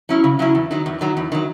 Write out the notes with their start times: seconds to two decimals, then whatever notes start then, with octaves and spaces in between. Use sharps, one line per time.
0.09 F#3 C#4 E4
0.24 C#3
0.39 F#3 C#4 E4
0.55 E2
0.71 D#3 F#3
0.86 E2
1.01 D#3 F#3
1.17 E2
1.32 D#3 F#3